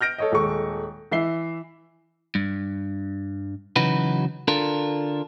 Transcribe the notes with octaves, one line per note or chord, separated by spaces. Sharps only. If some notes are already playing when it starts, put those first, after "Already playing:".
F6 G6 A#6 D7
A4 C#5 D#5
D#1 G#3 A4 C#6
E3 E5 C7 G7
G2
C#3 E3 F#3 D#4 F#4 B4
D3 D4 F4 A4 A#4